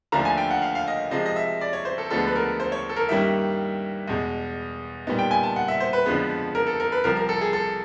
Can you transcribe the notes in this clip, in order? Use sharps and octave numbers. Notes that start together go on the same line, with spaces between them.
D#2 D3 F3 A3 D4 A#5
G#5
G5
F#5
F5
F5
D#5
C3 F3 G#3 D#5
D#5
E5
D5
C#5
C5
A4
D2 D3 F3 G#3 B3 A4
B4
A#4
C5
C#5
A4
A#4
G2 D#3 G3 A#3 C#4 E5
E2 B2 G#3
A#2 G3 B3 D#4
G5
G#5
A5
F#5
E5
C5
B4
F2 D3 F3 G#3 B3
A#4
A4
A#4
B4
C2 C3 F3 A#4
A#4
A4
G#4
A4